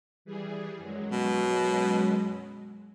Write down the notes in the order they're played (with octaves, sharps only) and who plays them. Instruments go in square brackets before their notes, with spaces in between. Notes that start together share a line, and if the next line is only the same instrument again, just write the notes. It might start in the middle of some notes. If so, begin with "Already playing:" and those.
[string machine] E3 G3 G#4
F#2 F#3 G#3
[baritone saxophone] B2